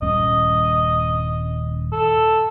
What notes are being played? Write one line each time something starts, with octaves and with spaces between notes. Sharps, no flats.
D#1 G2 C#4 D#5
A4